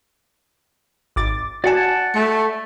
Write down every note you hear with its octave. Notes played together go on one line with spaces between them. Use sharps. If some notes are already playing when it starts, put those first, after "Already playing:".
G#1 D6 A6
F#4 D5 F#5 G#5 A5
A3 C#7